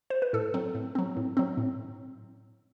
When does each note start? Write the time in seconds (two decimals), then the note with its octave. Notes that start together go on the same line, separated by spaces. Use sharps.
0.10 C5
0.22 B4
0.33 A2 A4
0.54 F#3 C4
0.75 A2
0.95 F#3 C4
1.17 A2
1.37 F#3 C4
1.57 A2